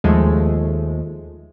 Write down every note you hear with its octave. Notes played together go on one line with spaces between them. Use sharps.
D#2 F3 G#3 A3